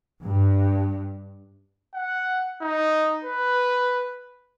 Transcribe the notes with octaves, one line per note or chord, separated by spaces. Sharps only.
G2
F#5
D#4
B4